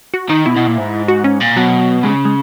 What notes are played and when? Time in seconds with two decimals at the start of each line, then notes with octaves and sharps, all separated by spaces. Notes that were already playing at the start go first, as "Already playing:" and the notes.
0.14 F#4
0.29 D#3 D#4
0.46 B2 E4
0.56 B2
0.67 A#2
0.77 G#2
1.08 F#4
1.24 C#4
1.40 A#2
1.56 B2 F#3
2.03 C#3 G#3
2.25 G#3